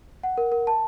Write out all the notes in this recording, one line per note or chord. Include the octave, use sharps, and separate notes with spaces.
F#5
A#4
A#4
A5